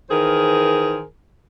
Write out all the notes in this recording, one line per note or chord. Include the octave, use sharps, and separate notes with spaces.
D#3 E3 G#4 A#4 C5